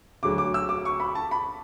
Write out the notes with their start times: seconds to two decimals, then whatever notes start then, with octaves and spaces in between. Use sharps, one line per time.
0.23 D2 D3 F#3 D6
0.38 D6
0.54 E6
0.69 D6
0.85 C#6
1.00 B5
1.15 A5
1.31 B5